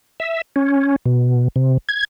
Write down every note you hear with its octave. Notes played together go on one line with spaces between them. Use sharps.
E5
C#4
B2
C3
G#6